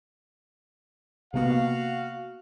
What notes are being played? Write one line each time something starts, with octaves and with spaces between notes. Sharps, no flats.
C3 A#3 B3 F#4 F5